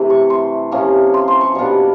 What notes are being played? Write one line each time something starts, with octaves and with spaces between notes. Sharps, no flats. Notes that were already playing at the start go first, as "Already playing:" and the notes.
Already playing: C3 E3 A3
C#6
C6
C3 F3 A#3 C#4
C6
C6
C#6
B2 G3 A#3 D4